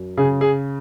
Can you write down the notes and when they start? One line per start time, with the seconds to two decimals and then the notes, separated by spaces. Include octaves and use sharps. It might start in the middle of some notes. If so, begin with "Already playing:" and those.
Already playing: F#2
0.17 C#3 G#4
0.41 G#4